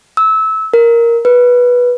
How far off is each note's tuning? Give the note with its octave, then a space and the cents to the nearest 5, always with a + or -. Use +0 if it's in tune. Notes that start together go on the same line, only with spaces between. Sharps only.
E6 -25
A#4 +0
B4 -10